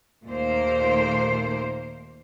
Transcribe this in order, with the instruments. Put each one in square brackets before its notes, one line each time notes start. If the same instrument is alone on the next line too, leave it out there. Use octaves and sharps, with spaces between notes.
[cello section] D#2 A#2 A3 A#3 C5